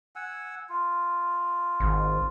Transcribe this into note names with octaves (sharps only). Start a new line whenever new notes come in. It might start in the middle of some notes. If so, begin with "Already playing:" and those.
F#5 G#5 E6
F4
G#1